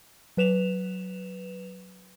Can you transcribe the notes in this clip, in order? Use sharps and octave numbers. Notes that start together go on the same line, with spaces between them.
F#3 B4 E7 F7